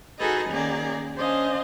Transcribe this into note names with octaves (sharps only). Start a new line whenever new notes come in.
D#4 F#4 G#4 A4 B4 D#5
D#3 A#3 C#4 G#4 D5
C#4 D4 C5 D#5 F5 G#5